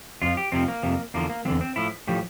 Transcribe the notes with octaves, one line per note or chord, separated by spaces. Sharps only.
F2 D3 F3 F4
G4
F2 C3 F3 C4
A#3
F2 C3 F3
E2 D3 F3 A#3
A#3
E2 D3 F3 C4
C4
A2 F3 E4
A2 F3 G4